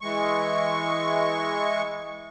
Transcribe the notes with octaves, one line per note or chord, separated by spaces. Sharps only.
E3 G#3 C#6